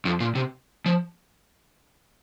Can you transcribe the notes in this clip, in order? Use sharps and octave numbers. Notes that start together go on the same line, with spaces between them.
F2
A#2
C3
F3